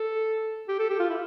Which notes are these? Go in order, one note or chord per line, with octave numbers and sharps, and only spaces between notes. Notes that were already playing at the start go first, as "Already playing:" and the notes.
Already playing: A4
G4
A4
G4
F4
E4